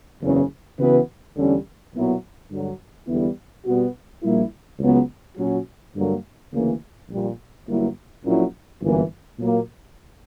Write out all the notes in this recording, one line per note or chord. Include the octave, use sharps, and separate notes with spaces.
F#1 E2 C#3
C#3 E3 B3 F#4 B4
E2 D3 G3 C#4
B1 A#2 F#3 B3 E4
G2 D3 F#3
E2 D3 G3 B3 E4
B2 G3 B3 F#4
A#1 A#2 G3 A#3 E4
C#2 C#3 F#3 B3
A#2 F#3 C#4 F#4
G2 D3 F#3 A#3
D2 C#3 E3 A#3
A#1 A#2 G3
G1 G2 F#3 A#3 E4
A#1 A#2 F#3 C#4 E4
G1 F#2 E3 A#3
A#2 F#3 A#3